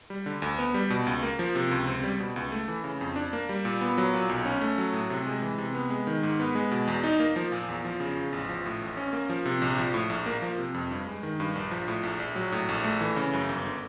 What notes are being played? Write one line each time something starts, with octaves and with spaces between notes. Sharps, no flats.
G3
D3
D2
B3
G3
B2
C#2
A#3
F3
C3
C#2
C4
G3
B2
C#2
A3
E3
C#3
F2
D4
A#3
G3
A#2
B3
F#3
A#2
B1
C#4
A3
F#3
A2
C3
G#3
E3
C3
B3
G#3
D#3
G#2
B3
G#3
B2
E2
D#4
A#3
F3
A#2
E2
F3
C#3
E2
A1
F3
A2
A1
C#4
A#3
F3
C3
A#1
F3
A2
A#1
A#3
F3
C3
F2
G2
G#3
D#3
G2
A#1
F3
A2
A#1
A#1
F#3
A2
A#1
A3
E3
C#3
F#2
G1
D3